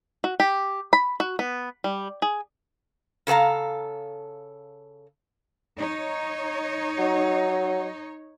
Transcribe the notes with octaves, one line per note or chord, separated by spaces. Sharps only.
F#4
G4
B5
F#4
B3
G3
G#4
C#3 A4 B4 F5 A#5
D#4 C#5
F#3